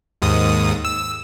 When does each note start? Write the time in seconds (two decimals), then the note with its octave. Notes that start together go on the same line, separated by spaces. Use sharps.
0.22 D#2 G#2 D#6
0.85 E6